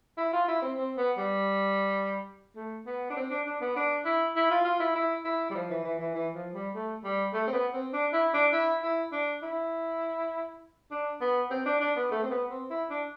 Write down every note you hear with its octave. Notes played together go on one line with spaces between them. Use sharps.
E4
F4
E4
C4
C4
B3
G3
A3
B3
D4
C4
D4
D4
B3
D4
E4
E4
F4
F4
E4
E4
E4
G3
F3
E3
E3
E3
E3
F3
G3
A3
G3
A3
C4
B3
C4
D4
E4
D4
E4
E4
D4
E4
D4
B3
C4
D4
D4
B3
A3
C4
B3
C4
E4
D4